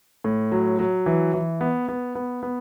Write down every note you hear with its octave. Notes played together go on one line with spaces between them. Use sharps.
A2
F#3
F#3
E3
E3
B3
B3
B3
B3